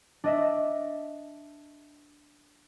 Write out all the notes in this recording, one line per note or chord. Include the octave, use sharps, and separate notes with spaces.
D4 D#5 E5